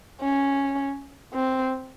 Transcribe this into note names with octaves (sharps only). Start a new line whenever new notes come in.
C#4
C4